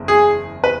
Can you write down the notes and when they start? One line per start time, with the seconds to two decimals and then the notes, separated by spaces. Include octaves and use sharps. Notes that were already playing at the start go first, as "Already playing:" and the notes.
Already playing: F#1 E2
0.08 G#4
0.64 B4